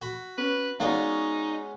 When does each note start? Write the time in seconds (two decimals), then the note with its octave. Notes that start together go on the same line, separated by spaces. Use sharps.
0.02 F#4 B5
0.38 C#4 B4
0.80 G#3 B3 C#4 D#4 F#4 D5 F5